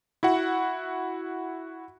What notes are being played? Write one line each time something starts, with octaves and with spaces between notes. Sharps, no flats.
E4 F#4 F#5